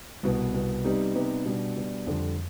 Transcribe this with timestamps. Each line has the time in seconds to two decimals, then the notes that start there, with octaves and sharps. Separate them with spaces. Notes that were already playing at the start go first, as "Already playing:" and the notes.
0.23 C2 B2 B3
0.54 C2 B2 B3
0.84 C3 G3 B3 D#4 G4
1.15 C3 G3 B3 D#4 G4
1.45 B2 G3 D4
1.76 B2 G3 D4
2.07 F2 D3 G3 C4